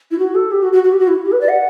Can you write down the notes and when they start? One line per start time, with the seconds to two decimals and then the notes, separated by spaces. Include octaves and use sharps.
0.11 E4
0.18 F#4
0.34 A4
0.51 G4
0.62 F#4
0.72 F#4
0.84 F#4
0.92 G4
0.99 F#4
1.08 E4
1.25 G4
1.32 B4
1.41 D5
1.48 F#5